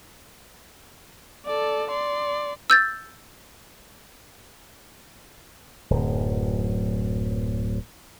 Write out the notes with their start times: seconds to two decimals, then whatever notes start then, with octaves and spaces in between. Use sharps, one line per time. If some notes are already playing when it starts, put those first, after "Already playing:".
1.46 A4 D5
1.90 D5 C6
2.70 E6 G6 A6
5.90 D1 F#2